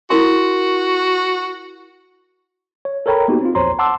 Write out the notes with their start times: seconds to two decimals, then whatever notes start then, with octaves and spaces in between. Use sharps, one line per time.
0.10 E4 F#4 A#4 C6
2.85 C#5
3.06 A4 A#4 C#5 G5 A#5 B5
3.28 A#3 B3 D#4 F#4 G4
3.41 C4 F4
3.55 A#1 E2 C5 C#5 A#5 C6
3.79 F#5 A5 C6 D6 E6